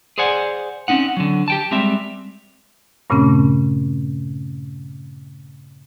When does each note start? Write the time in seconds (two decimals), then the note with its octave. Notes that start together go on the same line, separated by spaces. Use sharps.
0.18 G#4 C5 D5 F#5 G#5
0.88 C4 C#4 D#4 F#5
1.17 D3 F#3
1.48 G4 G5 A5
1.71 G3 G#3 C4 E5
3.10 G2 A#2 C#3 A3 C4 C#4